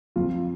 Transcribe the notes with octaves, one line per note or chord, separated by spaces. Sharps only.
F2 F4